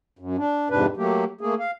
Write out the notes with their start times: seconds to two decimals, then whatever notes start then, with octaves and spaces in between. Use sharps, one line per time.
0.19 F#2
0.37 D4
0.70 F2 G#2 C3 D4 B4
0.97 F#3 A3 A#3 G4
1.41 A3 A#3 G#4
1.59 F5